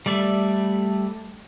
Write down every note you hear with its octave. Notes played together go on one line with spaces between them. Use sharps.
G3 A3 D5 E5